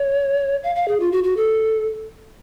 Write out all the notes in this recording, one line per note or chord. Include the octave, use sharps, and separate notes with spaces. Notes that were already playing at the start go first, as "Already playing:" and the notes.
Already playing: C#5
F5
F5
G#4
F4
F#4
F#4
A4